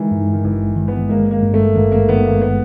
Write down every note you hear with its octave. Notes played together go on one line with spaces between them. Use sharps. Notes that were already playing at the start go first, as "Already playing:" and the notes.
Already playing: D#3 E3 G#3
G2 D#3
D#3
G#1 E3
D#3
B3
G#3 A#3
A#3
G2
A3
G#1 A#3
A#3
D#3 B3
A#3
B3